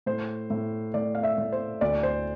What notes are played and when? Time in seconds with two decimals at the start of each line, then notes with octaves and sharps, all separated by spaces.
0.06 A2 C5
0.50 A2
0.94 A2 D5
1.15 F5
1.23 E5
1.38 A2
1.52 C5
1.81 D2 D5
2.03 C5